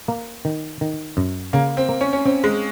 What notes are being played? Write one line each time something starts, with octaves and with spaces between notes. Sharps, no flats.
A#3
D#3
D#3
F#2
C#3 A#3
C4
A#3
C#4
C#4
C4 C#4
G#3